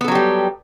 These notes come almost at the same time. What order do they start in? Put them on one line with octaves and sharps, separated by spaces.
B3 A4 F#3 G4 G3